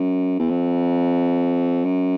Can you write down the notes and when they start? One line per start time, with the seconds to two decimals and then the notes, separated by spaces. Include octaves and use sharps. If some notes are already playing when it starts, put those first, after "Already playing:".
Already playing: F#2
0.39 E2
0.50 F2
1.85 F#2